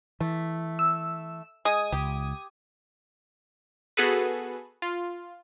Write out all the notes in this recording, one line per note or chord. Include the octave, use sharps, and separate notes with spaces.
E3 A3
E6
G#3 D#6 G#6
C#2 G4
B3 F#4 G#4 A4 B4
F4